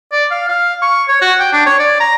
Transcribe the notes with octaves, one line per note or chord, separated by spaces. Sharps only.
D5
F5
F5
C#6
C#5
F#4
G5
D4
C#5
D5
A#5